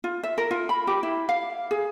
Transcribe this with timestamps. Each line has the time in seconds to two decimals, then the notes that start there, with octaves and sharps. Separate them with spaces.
0.04 F4
0.23 E5
0.38 A#4
0.51 F4
0.69 B5
0.87 G4
1.03 E4
1.29 F5
1.71 G#4